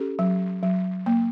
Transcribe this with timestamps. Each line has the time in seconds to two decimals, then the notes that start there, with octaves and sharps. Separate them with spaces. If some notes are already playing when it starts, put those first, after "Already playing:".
Already playing: C#4 G4 A4
0.19 F#3
0.63 F#3
1.06 A#3